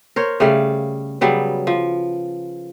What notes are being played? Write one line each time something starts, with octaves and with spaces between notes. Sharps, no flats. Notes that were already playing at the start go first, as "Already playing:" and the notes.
A#4 C5 C#5
C#3 G3 A3 F5
C#3 F#3 G3 B3
F3